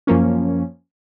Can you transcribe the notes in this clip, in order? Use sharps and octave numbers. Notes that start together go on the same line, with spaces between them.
F#2 F3 A#3 C#4